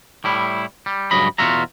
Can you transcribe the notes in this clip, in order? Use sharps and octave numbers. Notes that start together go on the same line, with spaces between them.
A2 G3 E4
G3
G2 C#3 F#3 G#3 D#5 B5
E2 B2 F4 F#4 E5 A#5